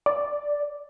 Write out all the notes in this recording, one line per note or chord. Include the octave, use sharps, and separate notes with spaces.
D5